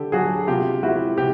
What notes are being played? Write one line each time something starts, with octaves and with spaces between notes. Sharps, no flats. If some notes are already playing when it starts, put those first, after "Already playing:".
Already playing: D3 G4 A4
F#3 F#4 G#4
C3 F4 G4
F3 G#3 E4 F#4
C3 G4